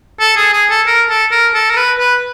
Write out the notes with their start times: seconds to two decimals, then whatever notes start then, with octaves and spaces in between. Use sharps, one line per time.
0.20 A4
0.37 G#4
0.53 G#4
0.70 A4
0.87 A#4
1.10 A4
1.31 A#4
1.54 A4
1.70 A#4
1.77 B4
1.99 B4